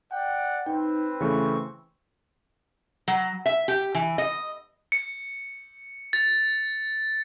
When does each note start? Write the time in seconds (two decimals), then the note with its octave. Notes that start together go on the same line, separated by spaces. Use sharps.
0.11 D5 F#5 G5
0.66 C4 D#4 B4 G5
1.21 C#3 E3 A3 C#6
3.08 F#3
3.46 E5
3.68 G4
3.95 E3
4.18 D#5
4.92 C#7
6.13 A6